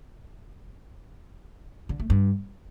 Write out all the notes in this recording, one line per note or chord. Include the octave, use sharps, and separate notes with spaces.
D3
A3
G2